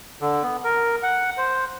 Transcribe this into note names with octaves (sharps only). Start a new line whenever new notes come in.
D3
B3
A#4
F#5
C5